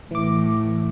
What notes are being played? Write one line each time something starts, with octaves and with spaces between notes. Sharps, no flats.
A2 E3 D6